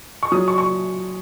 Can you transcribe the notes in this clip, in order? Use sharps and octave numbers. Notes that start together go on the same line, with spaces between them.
C#6
F#3 D#6
C#6
C#6